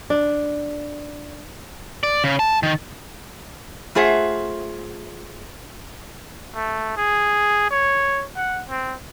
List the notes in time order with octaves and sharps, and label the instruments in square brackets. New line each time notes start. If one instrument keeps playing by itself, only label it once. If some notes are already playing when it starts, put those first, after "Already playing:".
[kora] D4
[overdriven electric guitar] D5
C#3
A5
D#3
[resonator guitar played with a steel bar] A3 F4 G#4 C5 E5 F#5
[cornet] A3
G#4
C#5
F#5
C4